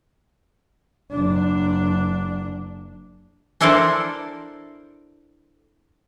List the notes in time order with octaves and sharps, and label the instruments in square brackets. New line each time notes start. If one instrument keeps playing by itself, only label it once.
[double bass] F#1 D4
[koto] D4 E4 A4 A#4 C5 D5